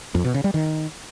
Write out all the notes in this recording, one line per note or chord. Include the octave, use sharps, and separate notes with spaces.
F2
B2
C#3
G3
D#3